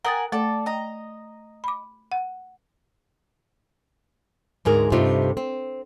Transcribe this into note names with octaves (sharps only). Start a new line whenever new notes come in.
A#4 F#5 G#5 A#5 D#6 A6
A3 A4 D5
D#5 A#5
B5 D6
F#5
D2 G#2 G#4 A#4
G2 C3 A3 D#4 F4
C4